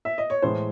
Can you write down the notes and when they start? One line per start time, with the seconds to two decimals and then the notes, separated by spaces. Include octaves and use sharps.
0.05 E5
0.18 D#5
0.30 C#5
0.42 A2 E3 G#3 C5